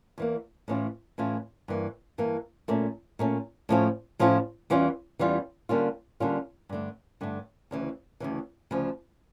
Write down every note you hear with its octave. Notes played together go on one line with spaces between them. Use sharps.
E2 E3 A#3
A2 E3 A3 C#4 F4
A2 E3 A3 C#4 F4
G2 E3 A#3
G2 E3 A#3
A#2 A3 C#4
A#2 A3 C#4
A2 F3 A3 C#4 F4
A2 F3 A3 C#4 F4
E2 E3 G3 C#4 F4
E2 E3 G3 C#4 F4
D3 G3 A#3 C#4 F4
D3 G3 A#3 C#4 F4
G2 D3 A3
G2 D3 A3
D2 C#3 E3
D2 C#3 E3
D2 C#3 F3